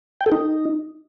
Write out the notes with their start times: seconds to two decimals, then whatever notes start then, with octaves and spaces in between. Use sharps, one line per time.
0.21 G5
0.26 A4
0.32 D#4